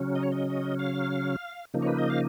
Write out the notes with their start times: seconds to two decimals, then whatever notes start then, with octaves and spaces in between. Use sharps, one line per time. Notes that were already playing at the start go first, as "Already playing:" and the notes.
Already playing: C#3 F#3 C#4
0.15 D#5
0.23 C#5
0.32 D#5
0.79 F5
1.74 C#3 F3 A#3 D#4
1.82 C#5
1.87 B4
1.98 D#5
2.10 F5